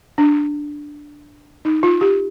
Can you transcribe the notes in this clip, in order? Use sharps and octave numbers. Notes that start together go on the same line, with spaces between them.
D4
D#4
F4
G4